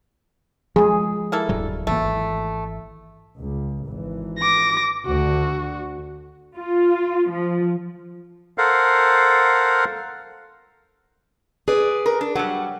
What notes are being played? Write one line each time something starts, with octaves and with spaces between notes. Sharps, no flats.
F3 G#3 G#4
A#3 E4 A4
D1 G2 F#3
G#1 E3 A3 A#3
C#2
G#1 E3
D6 A#6
D2 D3 F#4
F4
F3
A4 A#4 C5 F5 F#5
G#4 B4 D5
A#4
D4
F#3 G3 F#5